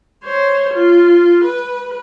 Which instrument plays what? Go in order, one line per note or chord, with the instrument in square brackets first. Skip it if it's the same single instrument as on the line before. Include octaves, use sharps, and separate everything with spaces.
[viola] C5 C#5
F4
B4